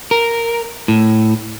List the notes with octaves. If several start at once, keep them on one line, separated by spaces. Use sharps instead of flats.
A#4
A2